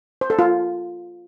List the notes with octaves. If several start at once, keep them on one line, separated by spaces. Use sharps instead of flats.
C5
A4
F4